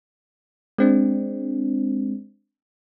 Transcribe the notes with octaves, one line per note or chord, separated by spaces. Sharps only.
G#3 C4 D4